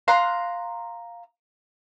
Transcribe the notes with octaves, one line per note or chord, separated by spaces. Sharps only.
F5 A#5 C6 F#6